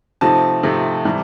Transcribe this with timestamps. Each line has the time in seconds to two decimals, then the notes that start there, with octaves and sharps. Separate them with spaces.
0.21 C3 F3 A3 C4 D#4 A5
0.63 C3 F3 A3 C4 D#4
1.05 C3 E3 G3